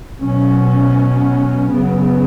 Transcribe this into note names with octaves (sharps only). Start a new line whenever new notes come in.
B2 F#3 C#4
F#2 C#3 F#3 B3